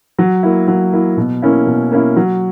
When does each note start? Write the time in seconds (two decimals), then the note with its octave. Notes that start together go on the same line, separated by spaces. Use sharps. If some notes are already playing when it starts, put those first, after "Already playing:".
0.18 F#3
0.43 A#3 E4
0.68 F#3
0.93 A#3 E4
1.17 B2
1.42 A#3 C#4 E4
1.67 B2
1.92 A#3 C#4 E4
2.16 F#3